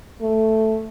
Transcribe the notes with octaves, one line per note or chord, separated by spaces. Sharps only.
A3